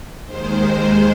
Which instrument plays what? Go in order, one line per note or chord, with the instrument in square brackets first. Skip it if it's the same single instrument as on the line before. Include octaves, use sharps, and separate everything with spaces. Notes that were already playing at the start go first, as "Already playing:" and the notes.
[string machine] D#2 D#3 G#3 C5